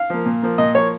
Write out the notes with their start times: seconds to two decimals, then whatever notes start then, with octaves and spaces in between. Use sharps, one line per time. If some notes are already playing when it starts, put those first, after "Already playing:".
Already playing: F5
0.10 F3 A#3
0.26 A#2
0.42 F3 A#3
0.58 A#2 D#5
0.75 F3 A#3 C#5